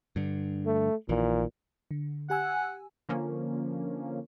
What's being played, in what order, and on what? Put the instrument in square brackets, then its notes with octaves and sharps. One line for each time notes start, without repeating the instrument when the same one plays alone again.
[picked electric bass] G2 D3
[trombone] A3
[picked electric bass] A#1 D#3 E3 [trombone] A#2
[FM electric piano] D3
[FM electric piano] G4 G#5 E6 [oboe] F#5
[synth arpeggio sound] D3 F3 A#3 C#4